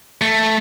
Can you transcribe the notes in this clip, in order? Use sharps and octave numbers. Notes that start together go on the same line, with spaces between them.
A3